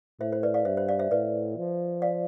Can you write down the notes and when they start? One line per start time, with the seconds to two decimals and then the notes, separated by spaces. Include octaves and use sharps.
0.20 A2 C5 E5
0.33 C5
0.43 B4 D5
0.54 D5 F5
0.65 G2 C5 E5
0.77 C5
0.88 D5 F5
0.99 C5 E5
1.11 A2 B4 D5
1.57 F3
2.02 D5 F5